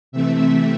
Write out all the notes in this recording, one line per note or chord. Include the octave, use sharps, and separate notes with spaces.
C3 E3 A3 C4 E5